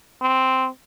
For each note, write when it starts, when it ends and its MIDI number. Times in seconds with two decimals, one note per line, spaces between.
0.22 0.68 60